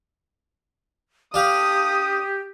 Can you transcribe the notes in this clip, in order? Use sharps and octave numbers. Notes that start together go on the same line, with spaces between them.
D4 G4 F5 D#6